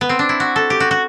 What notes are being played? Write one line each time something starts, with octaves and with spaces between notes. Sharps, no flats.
B3
C4
D4
E4
F#4
A4
G4
F#4
F#4